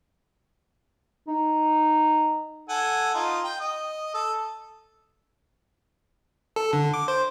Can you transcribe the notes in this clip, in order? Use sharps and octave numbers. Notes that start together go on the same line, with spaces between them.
D#4
A4 F#5 G#5
D#4 F4
G5
D#5
A4
A4
D3
D6
C5